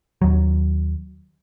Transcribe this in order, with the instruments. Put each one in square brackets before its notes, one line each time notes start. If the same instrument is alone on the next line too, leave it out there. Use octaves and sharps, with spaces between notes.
[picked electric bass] D#2 F#3